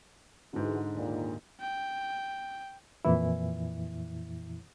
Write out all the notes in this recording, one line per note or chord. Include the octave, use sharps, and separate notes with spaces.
G#2 D3 E3 G#3 F#4
D#2 A#2
G5
F2 A#2 E3 E4